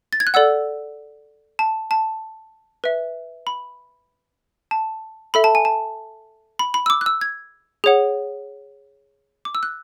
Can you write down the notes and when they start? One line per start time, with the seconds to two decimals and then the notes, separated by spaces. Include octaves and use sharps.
0.13 A6
0.20 G#6
0.27 F#6
0.34 A4 D5 F#5 E6
1.59 A5
1.91 A5
2.84 B4 E5
3.47 B5
4.71 A5
5.34 A4 E5 B5
5.44 A5
5.55 G#5
5.65 A5
6.59 B5
6.74 B5
6.86 E6
6.90 D6
7.01 F#6
7.06 E6
7.21 G#6
7.84 G#4 C#5 F#5
9.45 D6
9.55 E6
9.63 F#6